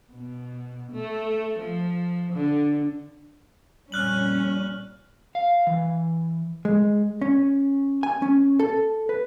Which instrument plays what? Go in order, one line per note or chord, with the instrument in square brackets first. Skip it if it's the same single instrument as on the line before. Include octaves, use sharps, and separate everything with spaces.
[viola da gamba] B2
A3
F3
D3
[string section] F2 A#2 C#4 [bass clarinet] G3 [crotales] F6 F#6 F#7
[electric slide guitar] F5
E3
[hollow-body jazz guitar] G#3
C#4
G#5
C#4
A4
B4